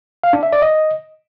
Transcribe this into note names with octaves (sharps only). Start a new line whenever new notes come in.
F5
D4
E5
D5
D#5